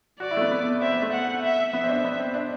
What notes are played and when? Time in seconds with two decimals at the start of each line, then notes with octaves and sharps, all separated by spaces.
0.20 F#4 D5
0.31 E4
0.37 A3
0.41 B3
0.51 B3
0.81 C4 E5
0.92 B3
1.02 A3
1.13 F#5
1.42 E5
1.73 B3 E5
1.84 C4
1.89 D4
2.04 B3
2.19 C4
2.34 D4